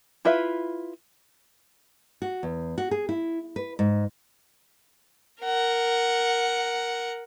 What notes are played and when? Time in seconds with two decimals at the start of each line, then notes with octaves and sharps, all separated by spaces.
0.25 E4 F4 B4 E5
2.22 F#4
2.43 E2
2.78 F#4
2.91 G#4
3.09 E4
3.56 B4
3.79 G#2
5.43 A#4 F#5